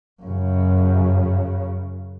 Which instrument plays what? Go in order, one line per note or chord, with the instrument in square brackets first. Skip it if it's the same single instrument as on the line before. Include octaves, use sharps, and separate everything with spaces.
[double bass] F#2 C#3